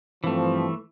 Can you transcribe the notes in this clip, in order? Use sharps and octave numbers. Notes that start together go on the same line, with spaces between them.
G2 E3 F3 A3 C4